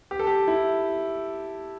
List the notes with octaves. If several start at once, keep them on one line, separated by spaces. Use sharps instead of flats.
G4
A4
G4
E4